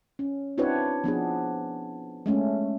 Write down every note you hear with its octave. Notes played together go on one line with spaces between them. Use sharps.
C#4
C4 D4 E4 F#4 B4 C#5
F3 B3 D4 G#4
G#3 A3 C#4